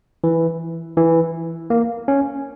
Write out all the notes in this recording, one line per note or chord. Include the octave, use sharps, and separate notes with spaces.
E3
E3
A#3
C#4